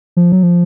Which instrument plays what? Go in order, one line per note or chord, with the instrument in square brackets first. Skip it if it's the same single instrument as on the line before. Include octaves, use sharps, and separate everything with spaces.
[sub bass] F3
F#3
F3